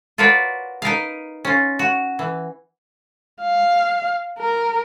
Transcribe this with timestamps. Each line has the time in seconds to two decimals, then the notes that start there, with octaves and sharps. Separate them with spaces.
0.18 F4 F#4 A#4 B4 C#5 D5
0.82 D#4 A#4 B4 F5
1.45 C#4 F4
1.79 F#4
2.19 E3
3.42 F5
4.39 A#4